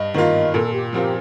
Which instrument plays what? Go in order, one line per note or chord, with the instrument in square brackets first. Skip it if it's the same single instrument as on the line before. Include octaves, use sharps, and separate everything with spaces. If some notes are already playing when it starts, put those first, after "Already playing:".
Already playing: [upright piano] G2 [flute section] D#5
[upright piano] D#3 A#3 F4
[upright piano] A#2 [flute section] A4
[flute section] G4
[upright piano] F3 C4 F4 A#4 [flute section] G4